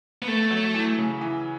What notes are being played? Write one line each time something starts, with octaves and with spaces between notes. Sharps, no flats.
B3
A3
F#3
E3
C#3
E3